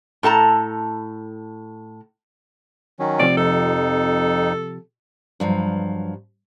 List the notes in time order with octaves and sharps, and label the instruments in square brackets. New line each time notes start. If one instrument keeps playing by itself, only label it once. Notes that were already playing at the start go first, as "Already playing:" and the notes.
[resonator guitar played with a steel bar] A2 A4 A5 A#5
[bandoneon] D#3 F#3 C#4
[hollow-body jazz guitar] C3 F3 [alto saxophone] D5
[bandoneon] F2 D#4 [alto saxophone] A4
[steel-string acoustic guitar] G2 F3 F#3